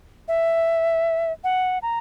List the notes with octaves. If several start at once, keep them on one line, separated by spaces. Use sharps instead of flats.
E5
F#5
A#5